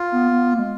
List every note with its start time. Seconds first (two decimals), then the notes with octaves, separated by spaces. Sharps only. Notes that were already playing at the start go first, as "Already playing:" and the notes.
Already playing: F4
0.12 B3
0.31 B3
0.53 A#3
0.59 G#3